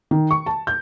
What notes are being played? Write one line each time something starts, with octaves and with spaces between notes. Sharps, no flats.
D#3
C#6
A5
G6